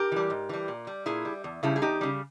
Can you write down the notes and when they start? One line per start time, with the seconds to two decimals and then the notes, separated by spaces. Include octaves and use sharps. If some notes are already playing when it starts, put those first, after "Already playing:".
Already playing: G4 A#4
0.12 E3 G3
0.30 G#2
0.49 E3 G3
0.68 A#2
0.87 G3
1.06 A#2 E4 G#4
1.25 G3
1.44 E2
1.63 C#3 G3 E4 G#4
1.76 G#4
1.82 E2 D#4 G4
2.01 C#3 G3